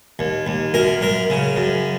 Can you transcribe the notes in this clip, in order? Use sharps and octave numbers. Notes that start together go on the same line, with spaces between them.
D#2
D#2
F#2 A#4
F#2 A#4
C#3
F#2